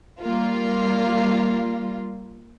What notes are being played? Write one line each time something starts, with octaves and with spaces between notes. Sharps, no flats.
G3 A#3 F4